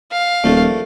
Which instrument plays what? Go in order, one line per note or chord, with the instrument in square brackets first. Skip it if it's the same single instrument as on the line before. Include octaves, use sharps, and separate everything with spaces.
[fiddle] F5
[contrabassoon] D#1 [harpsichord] A#1 A3